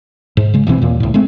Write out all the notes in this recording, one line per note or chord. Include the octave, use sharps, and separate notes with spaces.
G#2
C#3 G#3
A1 B2 E3 C4
D#2 A#2
C#2 A2
G#3 A3 C4